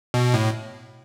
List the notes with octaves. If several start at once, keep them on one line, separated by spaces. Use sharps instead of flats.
B2
A2